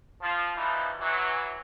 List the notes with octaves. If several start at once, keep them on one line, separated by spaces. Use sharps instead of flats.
F3 F4
B2 E3 F3 G3 D#4 E4
E3 F#3